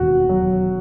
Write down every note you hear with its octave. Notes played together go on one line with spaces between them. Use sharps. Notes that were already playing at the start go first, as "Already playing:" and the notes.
Already playing: E1 D#2 F#4
F#3